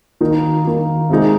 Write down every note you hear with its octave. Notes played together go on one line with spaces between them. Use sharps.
D#3 A#3 D#4
D#3 A#3 D#4
C3 G#3 D#4